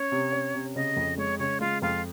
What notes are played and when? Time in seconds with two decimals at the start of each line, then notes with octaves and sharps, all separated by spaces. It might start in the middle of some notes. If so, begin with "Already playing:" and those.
Already playing: C#4 C#5
0.12 C3
0.32 C#4
0.54 C3
0.76 C#3 D#5
0.96 F2
1.18 G#3 C#5
1.39 C#3 C#5
1.60 G#3 F4
1.82 F2 F4